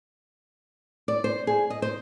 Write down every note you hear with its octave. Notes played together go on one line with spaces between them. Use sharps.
D5
C5
G#4
D#5
C5